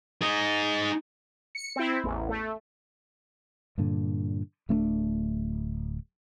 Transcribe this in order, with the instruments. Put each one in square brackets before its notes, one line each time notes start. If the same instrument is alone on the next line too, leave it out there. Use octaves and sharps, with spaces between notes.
[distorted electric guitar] D#4 G#4
[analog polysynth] C#7
C4 E4
A1 E2
A3
[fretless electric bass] G2 A#2 D3
D1 A3 B3 D4